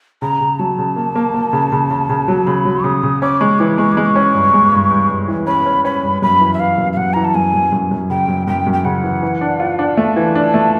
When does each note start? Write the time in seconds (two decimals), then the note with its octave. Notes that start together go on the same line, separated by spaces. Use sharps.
0.22 C#3 A#5
0.41 C#3
0.59 F#3 A5
0.78 C#3
0.96 A#3
1.15 A#3
1.34 A#3
1.53 C#3
1.72 C#3
1.90 C#3
2.09 C#3
2.28 F#3
2.47 C#3 B5
2.65 F#3
2.84 C#3 D#6
3.03 C#3
3.22 C#4 D6
3.40 G#3 C#6
3.59 E3 D6
3.78 G#3 C#6
3.92 D6
3.97 G#3
4.05 C#6
4.16 C#4
4.35 G2
4.53 G#3
4.72 G2
4.91 G2
5.10 G2
5.28 E3
5.47 C#4 B5
5.66 C#4
5.85 C#4 B5
6.03 G2
6.22 F#2 B5
6.40 E3
6.54 E5
6.60 E3 F5
6.78 F#2
6.93 F5
6.97 F#2 F#5
7.14 E3 A#5
7.24 A5
7.35 F#2 G#5
7.54 F#2
7.72 F#2
7.91 F#2
8.10 C#3 G5
8.28 F#2
8.47 F#2 G5
8.67 F#2
8.73 G5
8.85 C#3 F#5
9.03 E3
9.22 E3
9.41 D4
9.60 F4
9.79 D4
9.97 A3 A5
10.16 E3
10.35 D4
10.54 A3